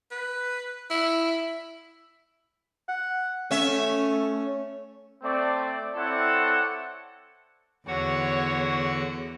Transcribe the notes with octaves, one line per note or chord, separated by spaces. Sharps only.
B4
E4
F#5
A3 C#4 E5
A3 C4 D5
C4 E4 A4 C#5 D5 F#5
E2 D3 F#4 C#5 F#5